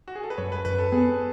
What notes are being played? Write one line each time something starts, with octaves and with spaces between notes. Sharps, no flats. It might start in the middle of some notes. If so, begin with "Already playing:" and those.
F#4
G#4
A4
B4
F#2 C#5
B4
F#2 B4
A4
B3 G#4